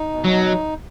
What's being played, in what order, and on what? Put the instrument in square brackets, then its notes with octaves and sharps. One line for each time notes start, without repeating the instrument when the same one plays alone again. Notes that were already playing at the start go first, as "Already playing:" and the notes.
Already playing: [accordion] D#4
B2
[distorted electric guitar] F#3
[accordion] D#4